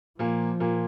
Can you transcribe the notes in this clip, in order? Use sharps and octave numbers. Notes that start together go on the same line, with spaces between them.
A#2 F3 A#3
A#2 A#3